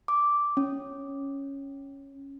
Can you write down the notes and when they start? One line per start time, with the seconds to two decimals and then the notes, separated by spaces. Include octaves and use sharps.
0.08 D6
0.57 C#4